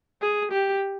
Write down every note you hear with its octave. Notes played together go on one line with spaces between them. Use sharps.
G#4
G4